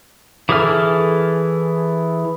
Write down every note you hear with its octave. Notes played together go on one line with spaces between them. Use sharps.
E3 G#4 A4 F6